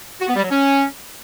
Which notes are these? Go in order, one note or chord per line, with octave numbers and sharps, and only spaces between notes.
F#4
B3
G3
F#3
C#4